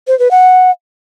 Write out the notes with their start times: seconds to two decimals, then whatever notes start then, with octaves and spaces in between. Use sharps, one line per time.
0.08 C5
0.19 B4
0.31 F#5